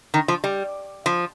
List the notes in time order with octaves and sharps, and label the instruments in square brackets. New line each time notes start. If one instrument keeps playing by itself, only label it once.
[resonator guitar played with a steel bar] D#3
F3
G3
F3